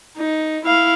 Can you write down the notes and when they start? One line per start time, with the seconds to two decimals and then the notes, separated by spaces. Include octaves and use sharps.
0.18 D#4
0.65 E4 F5